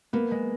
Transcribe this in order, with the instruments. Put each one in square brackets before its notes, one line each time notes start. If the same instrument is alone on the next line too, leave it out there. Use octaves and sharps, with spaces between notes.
[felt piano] A#3 [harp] B3
[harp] G#3